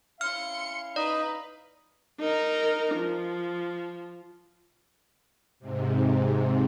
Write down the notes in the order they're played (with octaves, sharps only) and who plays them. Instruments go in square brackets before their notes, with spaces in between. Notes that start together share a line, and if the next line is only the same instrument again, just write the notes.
[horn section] C#4 E4 F5 [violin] C6 C#7 [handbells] F6
[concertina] D#4 D#5 [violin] B4 [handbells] D5
[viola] D#4 A#4
F3
[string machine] G#2 C3